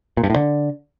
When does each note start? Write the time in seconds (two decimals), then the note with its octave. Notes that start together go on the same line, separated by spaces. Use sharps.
0.17 A#2
0.23 G2
0.30 A2
0.36 D3